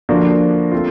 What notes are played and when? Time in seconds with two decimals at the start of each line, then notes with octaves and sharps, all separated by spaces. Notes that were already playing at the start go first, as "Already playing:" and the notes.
0.09 D3 F3 A#3 D4 F#4
0.72 A3 C4 F4